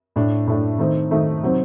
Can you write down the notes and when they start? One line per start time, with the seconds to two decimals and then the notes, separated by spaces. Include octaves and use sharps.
0.16 A2 A3 D4
0.47 A2 A3 D4
0.78 D#3 A3 C4 D#4
1.11 D#3 A3 C4 D#4
1.42 C3 F#3 C4 D#4